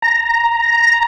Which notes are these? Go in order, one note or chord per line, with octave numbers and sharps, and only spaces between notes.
A#5